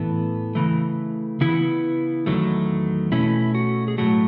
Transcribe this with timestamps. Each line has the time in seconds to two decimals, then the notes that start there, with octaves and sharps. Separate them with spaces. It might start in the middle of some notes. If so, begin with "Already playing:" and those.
Already playing: A2 E3 B3 A4
0.55 C#3 E3 A3
1.41 C#3 E3 B3 E4
2.26 E2 D#3 F#3 A3
3.12 B2 A3 C#4 E4
3.55 F#4
3.88 G#4
3.98 A2 F#3 A3 F#4